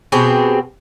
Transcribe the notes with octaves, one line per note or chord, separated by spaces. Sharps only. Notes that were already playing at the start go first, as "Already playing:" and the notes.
B2 C4 G4 G#4